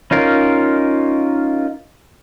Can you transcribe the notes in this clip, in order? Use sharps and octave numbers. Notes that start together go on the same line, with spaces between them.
C#4 D#4 F4 A#4